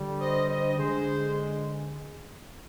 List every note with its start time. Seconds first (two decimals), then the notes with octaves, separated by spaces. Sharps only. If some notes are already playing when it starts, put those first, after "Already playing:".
Already playing: D3 G3
0.20 C5 D#5
0.48 C5 D#5
0.78 D3 G#3 G#4 C5